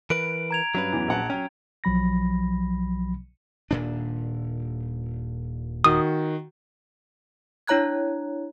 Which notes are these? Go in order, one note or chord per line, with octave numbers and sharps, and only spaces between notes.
E3 A#4 B4 D7
A#5 G#6 F7
G2 F#3 C#4 B4
E2 E3
A#1 F#5 A5
F#3 C#4 G5
B1 F3 F#3 B5 A#6
D#1 A#2 D4
D#3 F#4 D#6
D4 E4 C#5 A#5 F#6 G#6